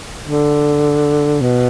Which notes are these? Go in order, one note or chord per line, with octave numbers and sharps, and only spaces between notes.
D3
B2